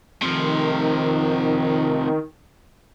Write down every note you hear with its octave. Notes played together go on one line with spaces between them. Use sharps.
C3 D#3 F3